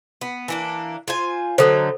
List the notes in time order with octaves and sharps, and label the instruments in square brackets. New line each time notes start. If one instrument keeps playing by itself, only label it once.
[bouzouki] B3
E3 A#3 D4
F4 C5 G#5
[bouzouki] D3 F#3 D#4 [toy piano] A4 C5